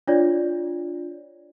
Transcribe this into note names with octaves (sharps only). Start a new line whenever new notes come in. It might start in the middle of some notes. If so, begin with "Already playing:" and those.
D4 F4 C#5 D5